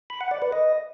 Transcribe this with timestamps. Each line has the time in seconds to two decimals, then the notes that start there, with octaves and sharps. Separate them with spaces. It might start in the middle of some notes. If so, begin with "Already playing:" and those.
0.10 B5
0.21 F#5
0.31 D5
0.42 B4
0.52 D#5